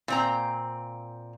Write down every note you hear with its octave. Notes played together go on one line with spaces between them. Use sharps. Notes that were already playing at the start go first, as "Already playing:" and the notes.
A#2 C4 A#5